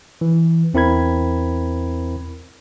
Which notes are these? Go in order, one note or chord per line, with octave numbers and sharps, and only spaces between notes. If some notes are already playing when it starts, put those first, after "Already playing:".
E3
E2 C4 E4 A#4 B5 G#6